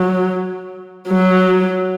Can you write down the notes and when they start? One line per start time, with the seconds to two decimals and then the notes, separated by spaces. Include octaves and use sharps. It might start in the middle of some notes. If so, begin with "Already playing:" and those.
Already playing: F#3
1.08 F#3